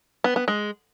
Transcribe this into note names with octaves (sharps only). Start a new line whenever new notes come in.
B3
B3
G#3